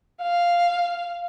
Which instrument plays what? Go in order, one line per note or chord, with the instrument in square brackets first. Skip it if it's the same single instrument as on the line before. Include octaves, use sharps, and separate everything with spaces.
[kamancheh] F5